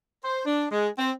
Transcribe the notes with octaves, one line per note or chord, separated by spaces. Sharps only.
C5
D4
G#3
C4